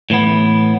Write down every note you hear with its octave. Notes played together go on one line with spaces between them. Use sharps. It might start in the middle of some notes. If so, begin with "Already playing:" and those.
A2 E3 B3